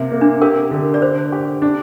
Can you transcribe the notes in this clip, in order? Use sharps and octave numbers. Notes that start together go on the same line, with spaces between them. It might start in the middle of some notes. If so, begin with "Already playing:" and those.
Already playing: C3 A#3
A#3
D4
G4 A#4
D3
D5
D4 C5
G4
D4